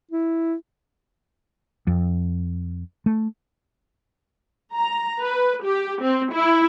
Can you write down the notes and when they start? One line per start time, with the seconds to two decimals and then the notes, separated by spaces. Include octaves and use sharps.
0.11 E4
1.87 F2
3.06 A3
4.74 A#5
5.21 B4
5.64 G4
6.01 C4
6.33 E4